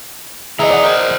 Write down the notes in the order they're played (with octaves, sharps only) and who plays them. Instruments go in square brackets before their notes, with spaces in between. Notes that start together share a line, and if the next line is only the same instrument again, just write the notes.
[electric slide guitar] E3 A#5 [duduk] G#4 [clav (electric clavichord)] D#5 E5
[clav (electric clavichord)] D5 D#5 F#5
[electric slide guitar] A#4 C5